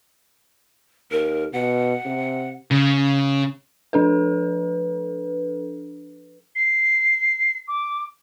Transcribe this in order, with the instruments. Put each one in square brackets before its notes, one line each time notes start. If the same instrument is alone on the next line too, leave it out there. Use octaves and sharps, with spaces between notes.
[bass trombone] D#2 [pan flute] A#4
[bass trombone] B2 [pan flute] F#5
[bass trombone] C3
[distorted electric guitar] C#3
[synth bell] F3 D4 A4 B4
[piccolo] C7
D6